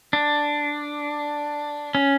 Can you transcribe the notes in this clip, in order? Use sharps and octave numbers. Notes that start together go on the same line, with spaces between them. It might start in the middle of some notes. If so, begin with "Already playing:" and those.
D4
C#4